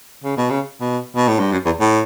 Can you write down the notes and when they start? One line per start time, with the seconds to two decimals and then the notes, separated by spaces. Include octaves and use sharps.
0.24 C#3
0.37 B2
0.50 C#3
0.81 B2
1.16 B2
1.28 A2
1.39 G2
1.52 F#2
1.65 E2
1.80 A2